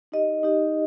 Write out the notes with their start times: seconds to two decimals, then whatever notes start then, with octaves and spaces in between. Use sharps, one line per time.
0.12 D#4 G4 D#5
0.43 D#4 G4 D#5